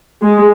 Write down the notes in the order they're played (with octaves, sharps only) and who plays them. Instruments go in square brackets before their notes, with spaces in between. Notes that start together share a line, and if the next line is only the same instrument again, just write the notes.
[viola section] G#3